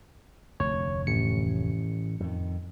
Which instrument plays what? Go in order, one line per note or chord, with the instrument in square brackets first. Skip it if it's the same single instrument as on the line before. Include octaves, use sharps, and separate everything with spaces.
[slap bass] F1 D2 [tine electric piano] C#5
[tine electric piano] A1 C#7
[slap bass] F2 D#3